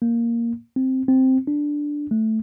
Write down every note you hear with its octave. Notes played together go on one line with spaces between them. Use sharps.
A#3
C4
C4
D4
A3